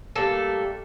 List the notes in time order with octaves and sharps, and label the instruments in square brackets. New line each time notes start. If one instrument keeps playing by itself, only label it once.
[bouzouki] G3 A3 A#3 A4